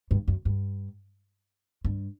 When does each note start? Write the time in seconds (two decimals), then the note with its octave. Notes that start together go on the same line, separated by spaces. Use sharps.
0.11 G2
0.28 F#2
0.45 G2
1.85 G2